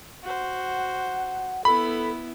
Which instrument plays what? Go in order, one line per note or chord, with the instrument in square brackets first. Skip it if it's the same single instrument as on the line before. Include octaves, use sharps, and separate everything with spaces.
[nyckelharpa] F#4 C5 [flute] F#5
[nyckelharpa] B3 E4 [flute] A4 [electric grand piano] B5